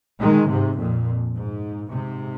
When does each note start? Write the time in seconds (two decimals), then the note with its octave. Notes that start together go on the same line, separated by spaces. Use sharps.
0.21 D#3 G#3
0.50 G#2 C3
0.78 F2 A#2
1.34 G#2
1.91 G#2 C3